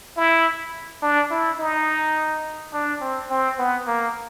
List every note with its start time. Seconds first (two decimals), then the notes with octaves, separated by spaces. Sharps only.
0.17 E4
1.02 D4
1.31 E4
1.59 D#4
2.74 D4
3.01 C4
3.30 C4
3.59 B3
3.87 A#3